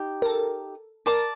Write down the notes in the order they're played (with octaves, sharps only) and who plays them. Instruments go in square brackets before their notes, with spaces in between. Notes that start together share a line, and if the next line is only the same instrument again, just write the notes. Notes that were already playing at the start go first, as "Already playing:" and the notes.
Already playing: [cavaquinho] D#4 G4
[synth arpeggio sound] A#4
A4
[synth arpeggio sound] A#4 [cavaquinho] D5 A5 D6